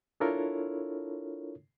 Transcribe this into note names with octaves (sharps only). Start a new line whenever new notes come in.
D4 E4 F4 A4 A#4 C#5